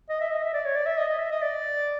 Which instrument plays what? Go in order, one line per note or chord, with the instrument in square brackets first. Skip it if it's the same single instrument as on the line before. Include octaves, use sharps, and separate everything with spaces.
[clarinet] D#5
E5
D#5
E5
D5
C#5
D5
E5
D#5
D#5
E5
D#5
D5